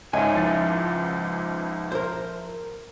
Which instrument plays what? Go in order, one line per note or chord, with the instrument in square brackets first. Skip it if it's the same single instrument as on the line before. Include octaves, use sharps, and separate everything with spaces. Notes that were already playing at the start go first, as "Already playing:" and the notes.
[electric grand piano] C#2 G#2 [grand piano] C#5 D#5 E5 [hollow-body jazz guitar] G#5
[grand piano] F3 E4 A6
[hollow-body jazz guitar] A#4 C5